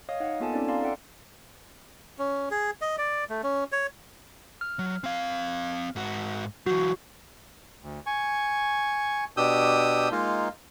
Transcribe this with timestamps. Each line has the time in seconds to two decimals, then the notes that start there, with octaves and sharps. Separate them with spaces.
0.09 C#5 D#5 F5 D#6
0.20 D#4 D#5 F5 F#5
0.40 A#3 B3 F4 A4 G#5 A5
0.54 C4 C#4 D#4 F4 A4 D5
0.68 D5 F5 A#5 C6
0.82 A4 D5 E5 F#5 G5
2.19 C#4
2.51 G#4
2.82 D#5
2.98 D5
3.29 A3
3.44 C#4
3.72 C#5
4.61 F6
4.79 F#3
5.04 C4 F5
5.96 G#2 F#4
6.66 E3 F#3 F#4
7.83 D2
8.06 G#5 C#6
9.37 B2 D4 G4 D#6 E6 G6
10.12 G#3 A#3 D#4 F4